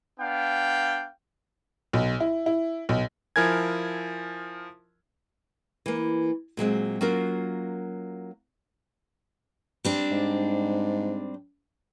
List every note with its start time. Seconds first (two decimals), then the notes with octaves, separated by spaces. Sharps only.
0.19 B3 D4 F5 G5
1.93 B1
2.20 E4
2.46 E4
2.89 B1
3.36 F3 E4 A#4 G#5 G#6
5.86 E3 A#3
6.57 A#2 F#3 G#3 C4
7.01 F#3 A#3 C#4 F4 F#4 A#4
9.85 G3 C4 D4
10.11 G#2